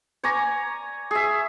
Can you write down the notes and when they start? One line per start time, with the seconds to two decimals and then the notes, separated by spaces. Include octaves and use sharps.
0.23 C#5 D5 G#5 A#5
1.11 G#4 E5